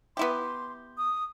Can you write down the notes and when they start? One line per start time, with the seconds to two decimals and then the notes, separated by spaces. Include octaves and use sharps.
0.17 B3 E4 G4 C6
0.98 D#6